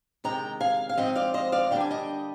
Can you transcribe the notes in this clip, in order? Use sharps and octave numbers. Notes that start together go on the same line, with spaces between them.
C3 D#3 G#3 G5 A#5
F5 G#5
F5
G#2 F3 C4 D#5 G5
D5 F5
C5 D#5
D5 F5
D3 G3 A#3 D4 G5
G#5
D#5 G5